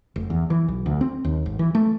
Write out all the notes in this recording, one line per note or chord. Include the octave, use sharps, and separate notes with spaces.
F1
E2
E3
B1
D2
C4
D#2
G#1
E3
A3